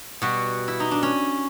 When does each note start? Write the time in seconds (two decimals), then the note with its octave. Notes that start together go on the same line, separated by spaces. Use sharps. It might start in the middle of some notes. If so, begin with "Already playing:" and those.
0.22 B2 G3 F#4
0.68 E4
0.80 D#4
0.91 D4
1.03 C#4